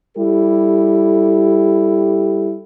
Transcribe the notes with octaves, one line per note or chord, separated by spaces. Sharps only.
G3 E4 G4 A4